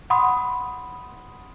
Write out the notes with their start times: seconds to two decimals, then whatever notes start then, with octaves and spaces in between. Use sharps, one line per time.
0.10 F#5 B5 C6 D#6